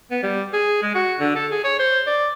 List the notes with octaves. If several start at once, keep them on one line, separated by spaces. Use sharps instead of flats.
B3
G3
G#4
G#3
F#4
D3
A4
G#4
C#5
C5
D5